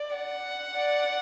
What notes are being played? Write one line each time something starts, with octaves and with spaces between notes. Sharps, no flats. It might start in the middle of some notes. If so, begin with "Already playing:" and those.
Already playing: D5
F#5
D5